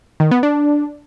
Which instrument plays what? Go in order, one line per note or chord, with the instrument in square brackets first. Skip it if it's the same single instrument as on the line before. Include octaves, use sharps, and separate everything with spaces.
[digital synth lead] D#3
B3
D4